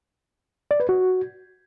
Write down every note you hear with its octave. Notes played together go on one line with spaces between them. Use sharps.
D5
B4
F#4